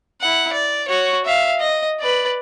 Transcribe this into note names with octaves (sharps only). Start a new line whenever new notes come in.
E4 F#5
D5
F#4 C#5
E5 F5
D#5
B4 D5